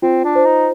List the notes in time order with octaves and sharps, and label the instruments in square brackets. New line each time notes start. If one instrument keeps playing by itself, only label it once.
[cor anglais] C4 [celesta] F4
[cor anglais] D4
[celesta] C5
[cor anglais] D#4